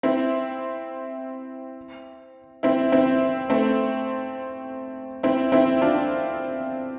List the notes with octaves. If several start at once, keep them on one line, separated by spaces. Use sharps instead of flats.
C4 E4
C4 E4
C4 E4
A3 C4
C4 E4
C4 E4
D4 F4